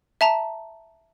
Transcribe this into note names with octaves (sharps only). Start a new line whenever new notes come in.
E5 A5 A#5